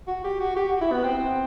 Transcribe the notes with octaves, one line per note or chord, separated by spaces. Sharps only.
F#4
G4
F#4
G4
F#4
E4
B3
C4